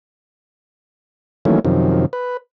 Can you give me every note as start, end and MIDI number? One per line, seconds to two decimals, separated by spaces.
1.45 1.60 51
1.45 1.60 52
1.45 1.60 54
1.45 1.60 57
1.45 1.60 58
1.45 1.60 61
1.65 2.06 42
1.65 2.06 48
1.65 2.06 51
1.65 2.06 53
2.13 2.37 71